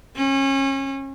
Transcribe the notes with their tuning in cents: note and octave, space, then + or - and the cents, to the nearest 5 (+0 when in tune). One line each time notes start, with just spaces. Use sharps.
C#4 -30